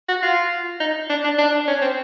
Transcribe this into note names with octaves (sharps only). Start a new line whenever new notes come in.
F#4
F4
D#4
D4
D4
D4
C#4
C4